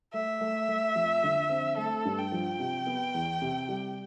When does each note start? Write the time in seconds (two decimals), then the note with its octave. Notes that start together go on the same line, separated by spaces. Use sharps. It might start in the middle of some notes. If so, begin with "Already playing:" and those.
0.14 A3 E5
0.41 A3
0.68 A3
0.95 F2
1.23 D3
1.49 C4
1.77 A3 A4
2.05 G2
2.19 G5
2.32 F3
2.59 C3
2.86 B3
3.14 E2
3.42 C3
3.68 G3